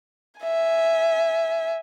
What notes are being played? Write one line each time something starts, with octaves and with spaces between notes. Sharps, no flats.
E5 G#5